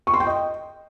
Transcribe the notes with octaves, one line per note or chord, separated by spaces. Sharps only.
C#6
C6
G5
D#5